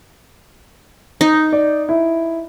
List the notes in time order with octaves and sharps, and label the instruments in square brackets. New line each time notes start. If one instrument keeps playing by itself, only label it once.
[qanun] D#4
[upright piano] D5
E4